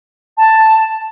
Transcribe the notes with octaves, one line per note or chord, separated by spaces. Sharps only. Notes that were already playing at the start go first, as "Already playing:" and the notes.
A5